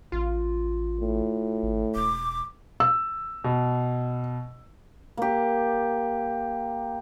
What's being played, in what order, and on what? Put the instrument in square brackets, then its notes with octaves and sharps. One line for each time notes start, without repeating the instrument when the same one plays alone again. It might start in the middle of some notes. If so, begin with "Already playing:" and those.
[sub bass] A1 [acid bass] F4
[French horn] A2
[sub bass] G#1
[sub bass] E1 [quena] D6
[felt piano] E6
[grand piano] B2
[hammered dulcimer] A#3 G4